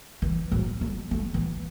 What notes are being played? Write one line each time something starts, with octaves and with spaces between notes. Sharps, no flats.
E3
F#3
A3
A3
E3